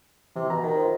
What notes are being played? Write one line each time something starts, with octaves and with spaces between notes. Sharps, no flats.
C3 E3
B2 A#5
D#3
F4 C5